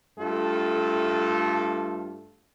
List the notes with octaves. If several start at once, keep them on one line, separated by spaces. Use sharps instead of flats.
G2 A3 F4 A4